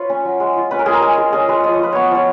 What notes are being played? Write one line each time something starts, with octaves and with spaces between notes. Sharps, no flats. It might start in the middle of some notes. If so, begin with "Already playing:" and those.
Already playing: F4 B4 C#5
C#4
F#3
G#3
F4
C#4 B4
A#4
G#3 G#4
A#4
G#3 G#4
F4 G#4
C#4 G#4
G#3 B4
F3 D#5
C#5
F4 B4
B3 C#5
F3 C#5